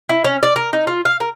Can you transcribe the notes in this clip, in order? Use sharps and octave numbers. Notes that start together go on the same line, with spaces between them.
E4
C#4
D5
A#4
D#4
F4
F5
A#4